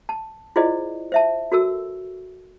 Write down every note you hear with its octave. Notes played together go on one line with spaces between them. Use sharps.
A5
E4 F4 G#4 C5 D5 D#5
C5 E5 A5
F#4 A4 A#4 E6